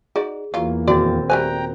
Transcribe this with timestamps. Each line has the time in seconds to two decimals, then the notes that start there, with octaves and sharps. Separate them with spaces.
0.16 D#4 F#4 G#4 D5
0.54 E2 E3 F#3 A#3 F4
0.87 D#1 C4 F#4 D5 A6
1.30 G3 A3 C5 G5 G#5 A#5